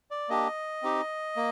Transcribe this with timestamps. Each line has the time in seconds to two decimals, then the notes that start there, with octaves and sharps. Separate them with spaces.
0.11 D5
0.29 A#3 D4 G4 D#5
0.83 C4 D#4 G4
1.36 A#3